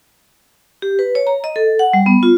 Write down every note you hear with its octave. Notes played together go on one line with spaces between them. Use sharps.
G4
B4
C#5
A#5
D#5
A4
F#5
G3
B3
F4